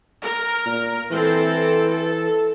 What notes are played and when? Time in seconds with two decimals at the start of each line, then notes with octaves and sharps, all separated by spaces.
0.22 A#4
0.66 A#2
1.11 E3 C4 A4
1.89 A4